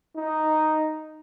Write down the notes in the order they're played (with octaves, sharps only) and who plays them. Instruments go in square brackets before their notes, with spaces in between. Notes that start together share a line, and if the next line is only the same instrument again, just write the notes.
[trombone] D#4